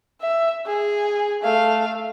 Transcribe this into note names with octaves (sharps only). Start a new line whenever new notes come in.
E5
G#4
A3 F5